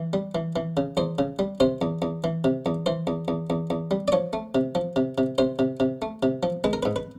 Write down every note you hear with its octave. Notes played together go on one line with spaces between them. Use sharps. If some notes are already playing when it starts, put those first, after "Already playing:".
Already playing: E3
G3
E3
E3
C#3
E2 C5
C#3
G3
C3 C5
E2
E2
E3
C3
E2
E3 C5
E2
E2
E2
E2
G3
D5
F3 C#5
A3
C3
F3
C3
C3
C3 C5
C3
C3
A3
C3
F3
G#3 B4
A#4
G#2 B4
B4